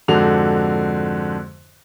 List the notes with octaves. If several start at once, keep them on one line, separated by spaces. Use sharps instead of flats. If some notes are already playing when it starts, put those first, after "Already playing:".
F2 G#2 D3 F#4 F7